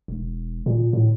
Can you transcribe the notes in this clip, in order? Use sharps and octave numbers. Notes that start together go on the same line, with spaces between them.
E1
A#2
A2